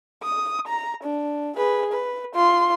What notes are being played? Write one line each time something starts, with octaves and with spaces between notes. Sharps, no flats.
D#6
A#5
D4
G#4 B4
B4
F4 C6